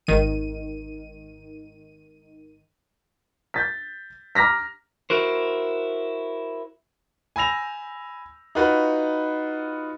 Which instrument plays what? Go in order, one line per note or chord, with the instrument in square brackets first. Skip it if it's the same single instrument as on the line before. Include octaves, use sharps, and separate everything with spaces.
[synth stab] G#1 D#3 D#7
[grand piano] G6 A6 B6
A#5 D6 F6 A#6 B6
[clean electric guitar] E4 F#4 A#4 C5
[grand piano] G#5 B5 E6 A#6 F7
D#4 F4 F#4 B4 F#5 B5